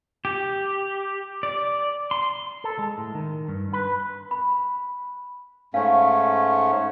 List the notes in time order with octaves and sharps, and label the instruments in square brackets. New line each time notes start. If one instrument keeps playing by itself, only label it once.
[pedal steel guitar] G4
D5
C6
[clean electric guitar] A4
G#3
A2
D#3
G2
B4
[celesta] B5
[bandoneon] G#2 A3 C#4 [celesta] F5